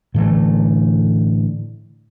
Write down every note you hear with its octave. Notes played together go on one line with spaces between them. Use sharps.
A2 D3 E3 A3